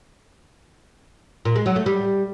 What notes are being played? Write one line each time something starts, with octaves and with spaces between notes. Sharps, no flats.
A#2
G#3
F#3
A3
G3